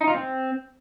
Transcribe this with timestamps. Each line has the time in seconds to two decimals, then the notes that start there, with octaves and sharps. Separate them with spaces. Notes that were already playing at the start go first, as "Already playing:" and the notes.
0.01 D#4
0.08 F4
0.15 C4